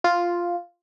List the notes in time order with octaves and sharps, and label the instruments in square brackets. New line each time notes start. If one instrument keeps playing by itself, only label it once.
[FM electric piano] F4